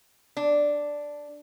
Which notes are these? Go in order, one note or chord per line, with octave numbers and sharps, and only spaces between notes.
D4